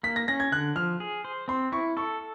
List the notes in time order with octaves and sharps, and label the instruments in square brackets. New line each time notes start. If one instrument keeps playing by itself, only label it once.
[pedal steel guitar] A#3 [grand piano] B6
[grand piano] A#6
[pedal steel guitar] C#4 [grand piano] A#6
[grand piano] G#6
[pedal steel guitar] D3 [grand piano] F#6
[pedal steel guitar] F3 [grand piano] F6
[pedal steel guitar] G#4
C5
[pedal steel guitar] C4 [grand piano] C6
[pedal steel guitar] E4 [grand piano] C#6
[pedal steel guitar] A4 [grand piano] C#6